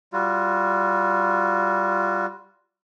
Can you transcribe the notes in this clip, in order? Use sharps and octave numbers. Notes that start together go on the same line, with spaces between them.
G3 F4 F#4